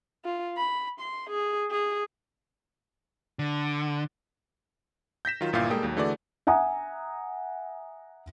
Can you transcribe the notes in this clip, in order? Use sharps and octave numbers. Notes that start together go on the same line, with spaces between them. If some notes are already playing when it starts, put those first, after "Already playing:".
F4
B5
C6
G#4
G#4
D3
G6 A#6 B6 E7
D#3 F#3 F4
G1 A#2 E4 F5 G6 A6
G3 G#3 A#3 A4 G5 D#6
D#2 F#3
D3 E3 A3 F#4 G#4 D5
E5 F#5 G#5 A#5 D#6